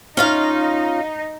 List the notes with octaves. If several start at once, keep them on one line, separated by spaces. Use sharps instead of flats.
C#4 D#4 F4 F5